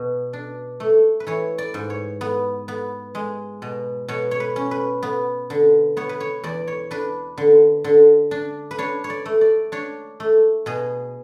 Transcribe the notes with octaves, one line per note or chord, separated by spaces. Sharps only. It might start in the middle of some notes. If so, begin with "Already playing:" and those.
Already playing: B2
D4
A3
B4
E3 C#5
D5
G#2
C#5
B3
B3
G#3
B2
B2 C#5
C#5
B4
C#4
B4
B3
D3
B3 C#5
B4
C#5
E2 D5
C#5
D4 B4
D3
D3
D4
B4
D4 C#5
C#5
D5
A3
D5
D4 C#5
A3
B2 G#4